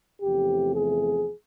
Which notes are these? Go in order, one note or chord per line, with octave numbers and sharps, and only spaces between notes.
E2 C3 F3 A3 C4 G4
G#4